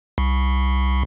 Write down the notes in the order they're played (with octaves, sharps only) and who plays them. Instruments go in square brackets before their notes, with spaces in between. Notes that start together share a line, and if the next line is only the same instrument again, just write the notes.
[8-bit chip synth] C2